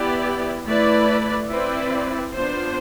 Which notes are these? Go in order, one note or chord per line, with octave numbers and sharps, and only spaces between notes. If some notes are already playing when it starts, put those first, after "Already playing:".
Already playing: B3 E4 G4 B4 D5
A3 E4 B4 D5
C4 E4 B4 D5
B3 D4 F4 C5